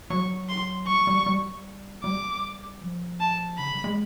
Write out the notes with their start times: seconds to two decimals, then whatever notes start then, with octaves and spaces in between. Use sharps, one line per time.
0.10 F#3 C#6
0.49 C6
0.87 G3 C#6
1.07 G3
1.26 G3
2.04 G3 D6
2.81 F3
3.20 A5
3.58 C#3 B5
3.72 G3
3.84 G#3